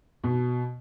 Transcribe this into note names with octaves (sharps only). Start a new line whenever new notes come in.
B2